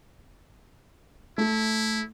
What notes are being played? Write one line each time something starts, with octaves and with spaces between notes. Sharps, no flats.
A3 E4